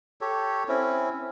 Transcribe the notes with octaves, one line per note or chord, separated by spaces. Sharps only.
G4 A4 C#5
C4 C#4 E4